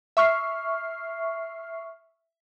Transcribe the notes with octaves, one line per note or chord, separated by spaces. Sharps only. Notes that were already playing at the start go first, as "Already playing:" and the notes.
E5 C#6 F6 C7